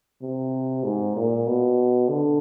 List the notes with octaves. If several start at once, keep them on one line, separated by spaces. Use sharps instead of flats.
C3
G#2
A#2
B2
D3